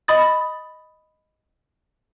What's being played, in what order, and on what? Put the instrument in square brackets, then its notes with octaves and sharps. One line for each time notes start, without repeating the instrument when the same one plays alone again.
[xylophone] D#5 B5 D#6 A6